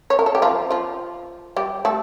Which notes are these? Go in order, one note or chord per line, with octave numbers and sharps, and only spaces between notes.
C#5
A#4
A4
G4
F3 F4
F3 F4
G3 G4
A3 A4